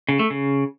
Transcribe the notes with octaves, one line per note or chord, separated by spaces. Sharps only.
C#3
A3
C#3